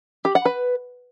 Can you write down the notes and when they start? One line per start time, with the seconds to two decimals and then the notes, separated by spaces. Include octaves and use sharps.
0.25 G4
0.35 F#5
0.45 B4